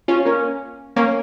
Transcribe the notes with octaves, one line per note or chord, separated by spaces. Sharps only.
C#4 F4
A#3 C#4
A#3 C#4